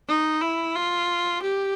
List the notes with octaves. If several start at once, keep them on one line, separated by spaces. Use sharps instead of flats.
D#4
E4
F4
G4